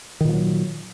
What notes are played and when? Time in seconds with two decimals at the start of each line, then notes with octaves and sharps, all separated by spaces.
0.21 D#3
0.25 A#2
0.29 F3
0.33 F#3